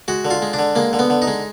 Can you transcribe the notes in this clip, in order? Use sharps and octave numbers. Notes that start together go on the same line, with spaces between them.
G#3 F#4
D3
F4
G#3
D4
D3
G#3 A#3
D3
B3
D3
D#4
G#3